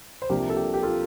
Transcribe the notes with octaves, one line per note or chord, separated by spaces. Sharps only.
C5
C2 C3 F3 A#3 D4 G4 A#4
A4
G4
G4
F4 A4